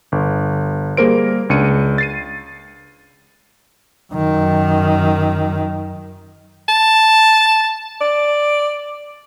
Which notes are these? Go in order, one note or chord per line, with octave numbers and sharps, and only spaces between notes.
G1
G3 A#3 G#4 A#4 C5 D7
C#2 D4 C#7 D#7
A6 C7 D#7
F#2 D#3
A5
D5